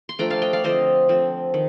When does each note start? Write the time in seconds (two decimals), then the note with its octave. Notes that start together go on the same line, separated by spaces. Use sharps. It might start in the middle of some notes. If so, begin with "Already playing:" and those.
0.09 C6
0.19 F3 A3 D4 G5 A#5
0.30 F5 A5
0.42 D#5 G5
0.53 D5 F5
0.64 D3 F3 C4 C5 D#5
1.09 D3 F3 C4
1.54 D#3